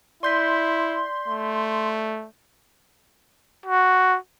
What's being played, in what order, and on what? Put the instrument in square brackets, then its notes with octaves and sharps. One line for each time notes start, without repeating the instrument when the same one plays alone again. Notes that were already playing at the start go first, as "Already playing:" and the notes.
[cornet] E4 [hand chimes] D5 G6 B6 [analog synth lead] C6
[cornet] A3
F#4